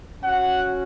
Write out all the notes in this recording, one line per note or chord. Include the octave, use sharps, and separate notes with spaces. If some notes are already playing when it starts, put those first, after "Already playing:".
C#4 F#4 F#5